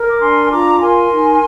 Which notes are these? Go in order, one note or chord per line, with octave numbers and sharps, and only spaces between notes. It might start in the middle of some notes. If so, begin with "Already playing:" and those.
Already playing: A#4
D6
D4 G#5 C6
F4 A#5 D6
A#4 G#5 C6
D#4